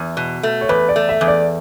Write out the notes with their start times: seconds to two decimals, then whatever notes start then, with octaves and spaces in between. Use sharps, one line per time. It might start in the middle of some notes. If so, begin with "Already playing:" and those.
Already playing: E2
0.17 B2
0.43 A3
0.61 C#5
0.69 E2 B4
0.89 D5
0.96 A3
1.09 E5
1.21 E2
1.28 D5